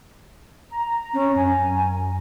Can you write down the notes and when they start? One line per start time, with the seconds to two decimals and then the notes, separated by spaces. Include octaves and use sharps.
0.73 A#5
1.14 C#4
1.36 F#2 G#5